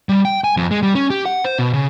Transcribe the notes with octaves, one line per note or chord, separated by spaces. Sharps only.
G3
G5
G#5
F2
G#3
G3
C#4
G4
F#5
C5
B2
C#3